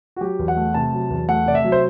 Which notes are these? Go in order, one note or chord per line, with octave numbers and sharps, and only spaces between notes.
F#4
F#3 G4
E2
F#5
A3
C3 A5
F#3
E2
A3 F#5
C3 D5
E5
F#3
C5